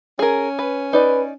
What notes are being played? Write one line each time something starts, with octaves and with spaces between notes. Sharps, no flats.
C#4 G#4 A#4
B4
D#4 B4 D5